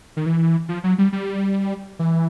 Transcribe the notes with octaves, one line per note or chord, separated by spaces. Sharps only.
D#3
E3
F3
F#3
G3
G3
E3